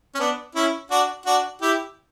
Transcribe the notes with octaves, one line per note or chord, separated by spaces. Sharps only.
C#4
B3 D4
C#4 E4
D4 F#4
D4 F#4
E4 G4